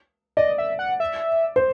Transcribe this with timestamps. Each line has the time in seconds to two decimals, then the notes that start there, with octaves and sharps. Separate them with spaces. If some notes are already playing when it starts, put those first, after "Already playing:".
0.37 D5 D#5
0.58 E5
0.79 F#5
1.00 E5
1.56 C5